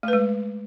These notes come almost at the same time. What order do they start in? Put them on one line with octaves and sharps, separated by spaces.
A3 B4 G#3